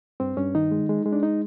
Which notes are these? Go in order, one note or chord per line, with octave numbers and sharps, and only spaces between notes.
G2 C4
G2 C#4
D#3 D#4
G#3
G#3
G#3
D4
D#4